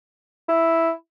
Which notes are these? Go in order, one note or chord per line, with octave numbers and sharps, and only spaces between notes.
E4